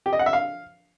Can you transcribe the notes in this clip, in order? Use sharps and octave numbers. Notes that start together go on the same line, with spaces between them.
G4
D#5
F#5
E5
F5